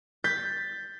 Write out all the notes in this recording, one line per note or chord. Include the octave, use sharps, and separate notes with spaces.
G6 A6 B6